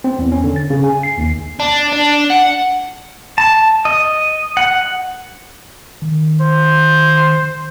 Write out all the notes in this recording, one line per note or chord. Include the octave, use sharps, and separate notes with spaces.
C4
E2
C#4
D3
A6
C#3
G#5
C7
D#2
D4
D4
F#5
A5
D#5
F#5
D#3
C5